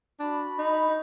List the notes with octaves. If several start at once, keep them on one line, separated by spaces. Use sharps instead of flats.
D4 F#4 B5
D#4